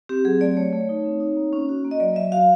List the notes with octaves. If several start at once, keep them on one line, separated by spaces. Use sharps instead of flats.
C4 G4
F#3 G#4
A3 D5
A3 C#5
A3
D#4
C4
D#4
A#3
C#4
F#4
A#3
D#5
F#3 D5
F#3 E5
F#4 F5